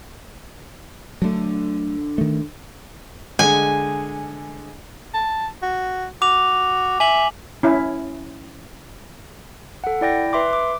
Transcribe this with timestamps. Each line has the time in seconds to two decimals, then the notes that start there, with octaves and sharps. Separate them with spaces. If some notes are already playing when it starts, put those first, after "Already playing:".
1.22 D3 F#3 A3 D4
2.18 D#3 A3
3.39 D3 G#3 G#4 G#5
5.14 A5
5.63 F#4
6.22 F#4 D6 F7
7.00 E5 G#5 F#7
7.63 C#4 E4
9.84 A4 F#5
10.01 E4 D5 G5 A#6
10.33 B4 E5 C6 D6
10.53 D6